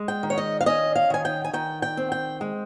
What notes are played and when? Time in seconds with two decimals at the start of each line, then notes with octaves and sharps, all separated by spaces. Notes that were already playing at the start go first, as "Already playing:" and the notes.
Already playing: G#3
0.08 G5
0.23 D#3
0.30 C#5
0.38 D#5
0.61 F5
0.66 C#4 D#5
0.95 F5
1.10 D#3 G#5
1.25 G5
1.44 G#5
1.53 D#3 G5
1.82 G5
1.97 C4
2.12 G5
2.41 G#3